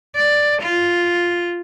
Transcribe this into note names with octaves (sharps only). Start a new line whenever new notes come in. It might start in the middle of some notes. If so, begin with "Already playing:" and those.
D5
F4